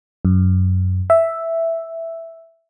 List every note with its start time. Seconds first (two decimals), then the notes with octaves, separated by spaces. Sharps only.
0.25 F#2
1.10 E5